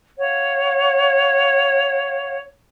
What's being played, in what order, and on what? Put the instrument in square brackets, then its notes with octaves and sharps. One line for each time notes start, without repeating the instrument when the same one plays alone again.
[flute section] C#5 F5 F#5